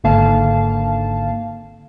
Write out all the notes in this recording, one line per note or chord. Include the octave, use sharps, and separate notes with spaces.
G#1 G#2 D3 A#3 F5 A5